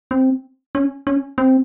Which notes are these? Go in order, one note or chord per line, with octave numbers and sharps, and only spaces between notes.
C4
C#4
C#4
C4